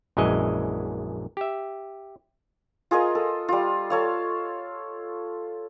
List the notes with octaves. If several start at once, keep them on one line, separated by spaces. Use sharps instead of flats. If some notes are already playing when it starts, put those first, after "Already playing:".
A#1 F#2 E3 G#3 D#5 G#5
G4 E5
F4 G#4 A#4 D#5
A4
G3 F4
A4 C#5 F5